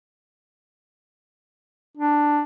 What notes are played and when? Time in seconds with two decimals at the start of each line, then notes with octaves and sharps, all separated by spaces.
1.97 D4